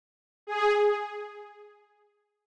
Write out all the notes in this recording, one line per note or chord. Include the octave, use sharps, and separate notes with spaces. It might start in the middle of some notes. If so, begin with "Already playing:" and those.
G#4